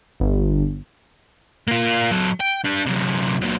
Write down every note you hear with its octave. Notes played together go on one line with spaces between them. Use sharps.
G1
A#3 F4
F#3 A4
G5
G3 D4
F#2 C3
A#2 F#3